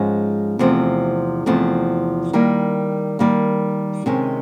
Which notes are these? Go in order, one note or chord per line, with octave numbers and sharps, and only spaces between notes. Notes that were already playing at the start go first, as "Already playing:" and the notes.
Already playing: G#2 F3 G#3 C#4
E2 C3 F3 A3
E2 C3 F3 A3
D#3 G3 A#3
D#3 G3 A#3
C3 D#3 G#3 C#4